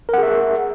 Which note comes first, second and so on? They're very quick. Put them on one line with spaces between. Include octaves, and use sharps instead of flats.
A#4 F#5 G#4 E5